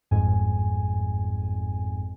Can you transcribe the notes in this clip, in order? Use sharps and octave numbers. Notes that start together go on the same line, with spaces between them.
G1 F2 G#2 G#5